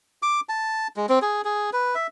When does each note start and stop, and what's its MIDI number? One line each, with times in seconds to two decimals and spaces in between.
0.22 0.40 86
0.49 0.88 81
0.96 1.06 56
1.09 1.19 60
1.22 1.42 68
1.45 1.70 68
1.73 1.95 71
1.95 2.07 76